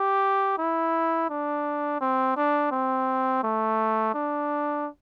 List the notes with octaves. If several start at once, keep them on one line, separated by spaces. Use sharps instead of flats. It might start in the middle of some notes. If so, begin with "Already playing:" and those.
Already playing: G4
E4
D4
C4
D4
C4
A3
D4